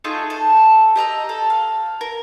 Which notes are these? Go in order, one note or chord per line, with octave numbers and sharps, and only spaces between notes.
A3 D#4 F4 G#4
A4
G4 D#5 A#5 E6
A4
F5
A#4